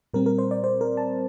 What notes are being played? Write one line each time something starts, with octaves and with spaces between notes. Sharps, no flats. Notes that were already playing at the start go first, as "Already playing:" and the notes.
A#2 G3 C4 A#4
A#4
C5
D5
C5
A#4
A5